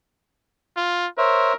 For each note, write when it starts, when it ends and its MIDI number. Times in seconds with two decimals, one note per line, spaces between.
0.76 1.07 65
1.18 1.55 70
1.18 1.53 72
1.18 1.53 73
1.18 1.53 76